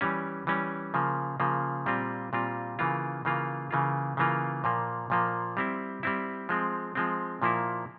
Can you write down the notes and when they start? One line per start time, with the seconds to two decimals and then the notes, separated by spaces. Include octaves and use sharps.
0.01 E3 G3 C#4
0.47 E3 G3 C#4
0.94 C#3 F3 A#3
1.40 C#3 F3 A#3
1.86 A#2 G3 C4 F4
2.33 A#2 G3 C4 F4
2.79 C#3 E3 A#3 F4
3.25 C#3 E3 A#3 F4
3.71 C#3 E3 A#3 F4
4.17 C#3 E3 A#3 F4
4.64 A#2 F3 A#3
5.10 A#2 F3 A#3
5.57 G3 C4 E4
6.03 G3 C4 E4
6.49 F3 G#3 C4
6.95 F3 G#3 C4
7.42 A#2 F3 A#3 E4